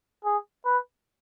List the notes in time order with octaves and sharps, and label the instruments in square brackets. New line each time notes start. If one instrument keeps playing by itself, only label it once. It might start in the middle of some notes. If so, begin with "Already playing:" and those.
[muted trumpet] G#4
B4